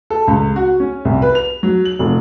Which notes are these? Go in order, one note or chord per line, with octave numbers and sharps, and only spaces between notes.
A4
C#2
F#4
C#4
C2
B4
F7
F#3
F#7
F1